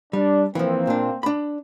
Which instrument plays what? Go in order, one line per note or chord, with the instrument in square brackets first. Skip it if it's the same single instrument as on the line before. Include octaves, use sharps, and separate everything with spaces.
[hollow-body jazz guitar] G3 [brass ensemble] D4
[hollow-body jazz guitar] E3 F3 [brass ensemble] A#3 C4
[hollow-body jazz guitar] A#2 D4
D4 B5